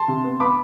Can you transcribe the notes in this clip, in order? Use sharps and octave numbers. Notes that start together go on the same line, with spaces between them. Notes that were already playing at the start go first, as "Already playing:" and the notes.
Already playing: A5 C6
C3
B3
B3 B5 D6